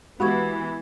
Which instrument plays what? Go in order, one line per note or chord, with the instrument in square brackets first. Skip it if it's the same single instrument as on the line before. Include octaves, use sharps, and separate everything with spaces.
[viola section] E3 B3 [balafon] G#3 G4 C#6 [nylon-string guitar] F#4 [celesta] B5 G#6